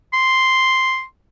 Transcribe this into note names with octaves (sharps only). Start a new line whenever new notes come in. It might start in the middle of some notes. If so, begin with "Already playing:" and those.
C6